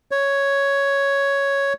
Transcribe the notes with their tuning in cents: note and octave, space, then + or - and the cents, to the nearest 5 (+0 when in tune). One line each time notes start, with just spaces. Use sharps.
C#5 +5